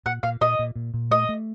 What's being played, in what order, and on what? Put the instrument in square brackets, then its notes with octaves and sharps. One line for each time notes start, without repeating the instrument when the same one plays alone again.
[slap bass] A#2 [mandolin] F#5
[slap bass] A#2 [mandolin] F5
[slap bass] A#2 [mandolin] D#5
[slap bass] A#2
A#2
A#2
[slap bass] A3 [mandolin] D#5
[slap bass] A3